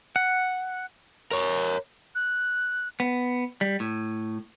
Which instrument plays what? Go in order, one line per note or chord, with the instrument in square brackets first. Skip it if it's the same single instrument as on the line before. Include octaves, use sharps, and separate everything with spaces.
[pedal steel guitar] F#5
[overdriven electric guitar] A#4 C#5
[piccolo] F#6
[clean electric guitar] B3
G3
A2